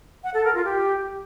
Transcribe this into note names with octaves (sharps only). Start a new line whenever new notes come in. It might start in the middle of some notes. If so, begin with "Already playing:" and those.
F#5
A4
A#4
F4
G4